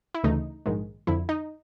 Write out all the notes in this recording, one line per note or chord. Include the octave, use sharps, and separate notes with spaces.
E4
D2 C#3 E3 A3 D#4
A#1 G#2 D#3 G#3
F2 D3 F3 E4
D#4